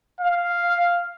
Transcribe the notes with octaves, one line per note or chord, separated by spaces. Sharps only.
F5